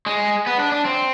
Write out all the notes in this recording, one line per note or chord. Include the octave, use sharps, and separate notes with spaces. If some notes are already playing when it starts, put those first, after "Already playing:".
G#3
B3
D4
D4
C4